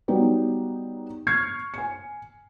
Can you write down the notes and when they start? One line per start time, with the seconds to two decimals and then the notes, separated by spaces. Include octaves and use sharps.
0.08 F#3 G3 B3 D#4 G4
1.27 C#6 F6 G#6 C7 C#7
1.74 G#5 C#7